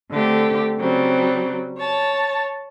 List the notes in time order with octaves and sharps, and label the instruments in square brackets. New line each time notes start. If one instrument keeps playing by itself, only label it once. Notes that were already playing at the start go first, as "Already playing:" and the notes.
[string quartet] D3 A3 C4 G4
C#3 F#3 G3 C4
C#5 A5